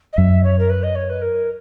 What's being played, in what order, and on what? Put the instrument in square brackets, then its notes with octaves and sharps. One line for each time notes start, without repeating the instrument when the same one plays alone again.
[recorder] D#5
[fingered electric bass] F#2 [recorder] E5
[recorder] C#5
A#4
B4
D#5
C#5
B4
A#4